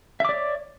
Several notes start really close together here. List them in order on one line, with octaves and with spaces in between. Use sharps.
E5 D6 D5 C#5